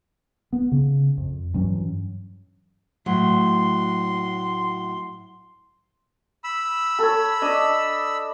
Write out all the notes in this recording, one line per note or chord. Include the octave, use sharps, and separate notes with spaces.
B3
C#3
F2
G2 E3 F#3 C#4
A2 F#3 C6
B5 E6
A4 C#5
D4 D#5